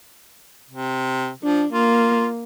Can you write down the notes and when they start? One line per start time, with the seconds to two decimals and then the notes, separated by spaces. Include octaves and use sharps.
0.70 C3
1.43 F3 D4
1.73 A#3 F4